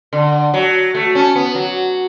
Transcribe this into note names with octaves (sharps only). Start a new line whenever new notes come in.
D3
F#3
A3
C#4
B3
F#3